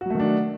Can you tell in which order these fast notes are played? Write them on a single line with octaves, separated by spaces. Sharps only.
F#4 F#3 A3 D#3 D4